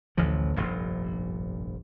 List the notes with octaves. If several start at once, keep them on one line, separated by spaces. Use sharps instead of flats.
A1 D2 E3 F3
F1 A#1 G2 A#2